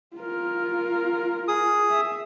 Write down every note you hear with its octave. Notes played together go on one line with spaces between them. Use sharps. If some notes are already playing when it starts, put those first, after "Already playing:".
F4 A#4
G#4 D#6
E5